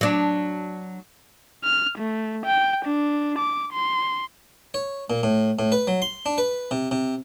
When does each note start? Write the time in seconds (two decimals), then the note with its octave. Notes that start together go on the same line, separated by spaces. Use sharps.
0.01 F#3 D4
1.64 F6
1.98 A3
2.46 G5
2.85 D4
3.39 D6
3.73 C6
4.74 C#5
5.10 A#2
5.23 A2
5.59 A2
5.72 B4
5.87 F#3
6.02 C6
6.26 D4
6.38 B4
6.71 C3
6.91 C3